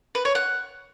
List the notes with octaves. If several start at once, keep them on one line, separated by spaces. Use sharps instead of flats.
B4
C#5
F#5